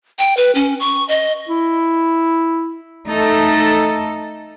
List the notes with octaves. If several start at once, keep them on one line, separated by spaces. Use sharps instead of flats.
G5
B4
C#4
C#6
D#5
E4
A3 D#4 A4